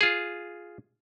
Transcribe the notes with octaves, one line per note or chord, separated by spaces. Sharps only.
F4 G#4